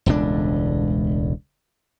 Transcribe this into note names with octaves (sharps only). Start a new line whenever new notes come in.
E1 C#2 A2 D4